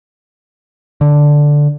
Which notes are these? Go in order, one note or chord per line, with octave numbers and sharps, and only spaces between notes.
D3